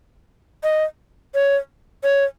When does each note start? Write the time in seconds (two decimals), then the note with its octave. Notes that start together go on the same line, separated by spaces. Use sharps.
0.63 D#5
1.35 C#5
2.03 C#5